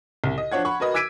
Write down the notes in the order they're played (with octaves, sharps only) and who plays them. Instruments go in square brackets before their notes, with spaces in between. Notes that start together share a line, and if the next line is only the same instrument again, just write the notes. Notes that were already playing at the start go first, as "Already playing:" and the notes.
[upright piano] C2
D#5
F3 D4 C#5 F#5 G#6
F#5 B5 C#6
F#4 A#4 B4 D#5
D6 E6 G#6 B6 D7 D#7